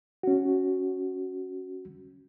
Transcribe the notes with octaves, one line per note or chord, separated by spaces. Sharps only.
C#4 F#4